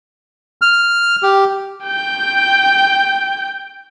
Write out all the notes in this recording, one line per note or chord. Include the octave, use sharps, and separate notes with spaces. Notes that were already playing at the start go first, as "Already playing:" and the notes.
F6
G4
G5 G6